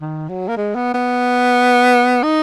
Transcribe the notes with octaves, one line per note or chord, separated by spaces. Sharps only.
D#3
F#3
A#3
G#3
B3
B3
D#4